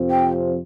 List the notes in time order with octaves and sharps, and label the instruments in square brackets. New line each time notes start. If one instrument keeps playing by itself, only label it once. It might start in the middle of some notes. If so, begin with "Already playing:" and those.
Already playing: [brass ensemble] F2 C3 F3 C4
[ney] G5